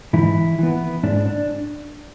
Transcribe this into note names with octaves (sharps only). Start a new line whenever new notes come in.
G#2 E3 E4
E3 B3
G#2 D4
D4